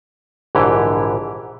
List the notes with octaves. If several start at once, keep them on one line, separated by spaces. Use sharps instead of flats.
A#1 G#2 D3 E3 G4